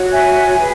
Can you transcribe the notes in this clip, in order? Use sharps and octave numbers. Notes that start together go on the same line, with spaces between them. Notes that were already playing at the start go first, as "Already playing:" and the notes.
Already playing: F#4 C#5
E5 G#5
G#4 B4